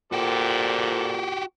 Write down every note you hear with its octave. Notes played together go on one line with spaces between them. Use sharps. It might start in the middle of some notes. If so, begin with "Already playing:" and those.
A#2 F#4 G4 A4 C5 D5